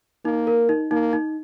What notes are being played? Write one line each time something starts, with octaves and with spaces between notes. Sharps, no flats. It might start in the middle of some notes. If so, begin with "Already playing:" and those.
A#3 D#4
A#4
D#4
A#3 D#4
D#4